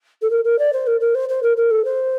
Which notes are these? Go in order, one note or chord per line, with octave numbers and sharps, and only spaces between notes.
A4
A#4
A#4
D5
C5
A#4
A#4
C5
C5
A#4
A#4
A4
C5